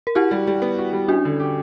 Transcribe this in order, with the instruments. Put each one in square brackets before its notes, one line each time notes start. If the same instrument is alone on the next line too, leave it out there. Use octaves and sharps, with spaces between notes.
[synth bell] A#4
[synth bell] E4 G4 [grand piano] F#4
[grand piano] G3
G3
B3
F#4
G3
[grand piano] C#4 [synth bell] D4 F#4
[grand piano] D3
G4